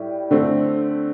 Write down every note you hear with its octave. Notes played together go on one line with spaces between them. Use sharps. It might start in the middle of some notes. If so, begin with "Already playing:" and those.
Already playing: A2 G3
D3 A3 C4